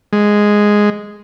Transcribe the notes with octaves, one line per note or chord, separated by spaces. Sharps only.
G#3